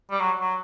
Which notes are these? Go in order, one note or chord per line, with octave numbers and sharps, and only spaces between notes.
G3
F#3
F#3